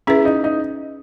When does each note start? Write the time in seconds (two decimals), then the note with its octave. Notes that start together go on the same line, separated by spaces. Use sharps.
0.07 C#4 E4 G#4 B4
0.25 D#4
0.44 D#4